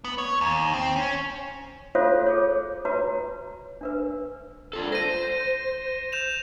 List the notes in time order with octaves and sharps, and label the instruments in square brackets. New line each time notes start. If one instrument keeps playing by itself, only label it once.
[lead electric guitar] B3
C#5
D#2
C4
C#4
[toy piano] F4 F#4 A4 C5 C#5 F5
G#4 A4 C#5
F#4 B4 C#5 A#5
D4 A#4 B4
[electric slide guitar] D4 F4 A4
[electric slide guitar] C5 [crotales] A#6 D#7
[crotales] G6 E7 F7